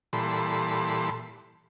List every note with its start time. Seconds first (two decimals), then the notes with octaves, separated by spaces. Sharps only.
0.13 A#2 E3 G3 A4 B5 C6